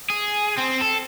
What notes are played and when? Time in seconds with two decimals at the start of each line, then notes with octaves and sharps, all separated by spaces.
0.10 G#4
0.58 C4
0.82 A4